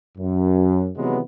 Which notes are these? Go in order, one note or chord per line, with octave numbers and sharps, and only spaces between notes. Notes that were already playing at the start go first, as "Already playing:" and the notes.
F#2
C3 D#3 E3 F#3 G#3 B3